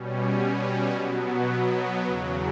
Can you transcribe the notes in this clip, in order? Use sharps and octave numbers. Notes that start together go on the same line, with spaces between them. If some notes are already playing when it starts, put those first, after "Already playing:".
Already playing: B2 G3 C#4
B2 F#3 B3
E2 C#3 F#3